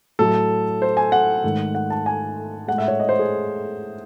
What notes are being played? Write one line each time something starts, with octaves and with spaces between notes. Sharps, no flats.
A2 F#3 A3 A4
C5
G#5
F#5
G#2 D#3 A3
F#5
A5
G#5
A2 G#3 F#5
E5
C#5
D#5
C5
G#4